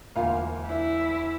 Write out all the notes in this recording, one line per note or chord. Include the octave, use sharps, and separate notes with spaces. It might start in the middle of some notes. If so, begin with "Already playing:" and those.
E1 D2 A#3 F4 F5 G#5
D4 E4 E5